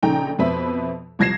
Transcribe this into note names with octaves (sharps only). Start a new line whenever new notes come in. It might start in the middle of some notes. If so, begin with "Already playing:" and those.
A#1 C#3 D#4 A4 G5 A#5
F2 B2 B4 C5 E5 B5
C2 F3 G#6 A#6 C7 E7